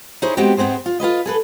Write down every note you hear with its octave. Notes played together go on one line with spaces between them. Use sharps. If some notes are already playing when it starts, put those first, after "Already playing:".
D#4 E4 G#4 C5 C#5
G#3 B3 C4 F#4 G4
G#2 B3 C4 G#4 C5
F4
F4 G#4 B4 D#5
G#4 A4 B4